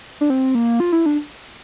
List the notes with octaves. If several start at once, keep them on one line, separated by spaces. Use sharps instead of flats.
D4
C4
A#3
F4
E4
D4